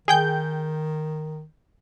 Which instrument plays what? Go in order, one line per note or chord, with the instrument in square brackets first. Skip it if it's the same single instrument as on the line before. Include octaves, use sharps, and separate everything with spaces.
[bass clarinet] D#3 [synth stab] G#4 G5 G6